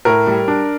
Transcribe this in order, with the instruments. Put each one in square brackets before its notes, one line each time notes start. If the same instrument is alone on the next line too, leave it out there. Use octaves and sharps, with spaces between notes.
[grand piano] A2 A#4
G3
D4